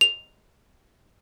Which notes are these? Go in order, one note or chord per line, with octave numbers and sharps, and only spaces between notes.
F7